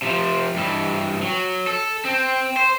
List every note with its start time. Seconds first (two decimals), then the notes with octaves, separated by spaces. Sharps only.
0.02 C3 F3
0.56 G2 E3
1.22 F#3
1.67 A4
2.05 C4
2.57 C5